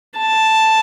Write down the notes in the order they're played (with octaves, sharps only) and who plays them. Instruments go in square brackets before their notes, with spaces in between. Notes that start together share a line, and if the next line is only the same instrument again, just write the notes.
[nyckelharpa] A5